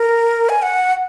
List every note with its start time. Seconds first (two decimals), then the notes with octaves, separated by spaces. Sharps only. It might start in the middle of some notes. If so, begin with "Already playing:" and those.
Already playing: A#4
0.49 G#5
0.62 F#5